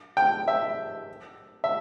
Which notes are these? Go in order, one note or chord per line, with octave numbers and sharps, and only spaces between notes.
G5
E5
E5